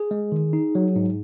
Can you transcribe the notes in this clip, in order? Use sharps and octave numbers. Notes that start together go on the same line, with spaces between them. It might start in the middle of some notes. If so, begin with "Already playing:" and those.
Already playing: G#4
G#3
D#3
D#4
F#3
G#2